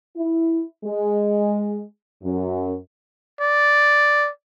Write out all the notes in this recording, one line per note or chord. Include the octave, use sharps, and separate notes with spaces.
E4
G#3
F#2
D5